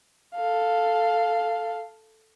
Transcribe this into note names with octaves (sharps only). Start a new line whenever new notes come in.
A4 F5